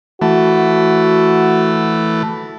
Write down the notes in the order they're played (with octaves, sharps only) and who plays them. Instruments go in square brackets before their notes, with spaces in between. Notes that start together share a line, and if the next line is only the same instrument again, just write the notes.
[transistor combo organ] E3 A3 [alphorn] F#4